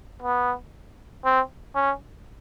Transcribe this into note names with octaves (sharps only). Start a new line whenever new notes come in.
B3
C4
C#4